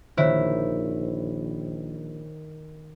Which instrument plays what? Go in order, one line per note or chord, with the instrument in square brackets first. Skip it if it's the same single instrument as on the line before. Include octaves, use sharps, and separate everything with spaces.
[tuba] A#1 [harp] D#3 [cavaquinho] E4 [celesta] C5 C#5